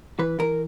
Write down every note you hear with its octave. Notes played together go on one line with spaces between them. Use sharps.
E3 B4
E3 A#4